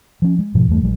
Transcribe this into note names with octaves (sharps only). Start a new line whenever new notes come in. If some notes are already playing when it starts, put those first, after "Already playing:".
F3 C#4
G#3
F1 G#2 B2 F3
E2 G2 A3
A#1 F#3 G#3